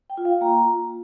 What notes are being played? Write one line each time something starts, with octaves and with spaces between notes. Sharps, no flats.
G5
F4
F5
A#3 A#5
F4